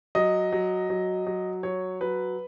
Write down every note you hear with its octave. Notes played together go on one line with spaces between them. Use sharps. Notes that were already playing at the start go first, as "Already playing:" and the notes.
F#3 D#5
F#3
F#3
F#3
F#3 C#5
F#3 B4